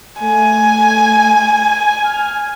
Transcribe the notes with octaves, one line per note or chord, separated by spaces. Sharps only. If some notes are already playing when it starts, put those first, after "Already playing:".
A3 G#5
F6